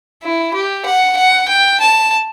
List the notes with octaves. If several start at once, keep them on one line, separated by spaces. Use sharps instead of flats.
E4
G4
F#5
F#5
G5
A5